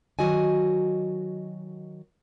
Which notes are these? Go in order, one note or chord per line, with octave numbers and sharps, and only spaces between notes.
D#3 F#3 F#4 D#5 G#5